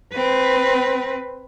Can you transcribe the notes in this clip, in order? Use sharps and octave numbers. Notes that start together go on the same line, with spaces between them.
C4 B4